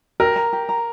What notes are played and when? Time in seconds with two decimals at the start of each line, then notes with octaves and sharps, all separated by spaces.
0.20 G4 A#4
0.36 A#5
0.53 G4
0.69 A#5